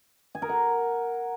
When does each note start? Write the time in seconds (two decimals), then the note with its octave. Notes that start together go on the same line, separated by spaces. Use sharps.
0.35 G#5
0.42 A#4
0.49 F#5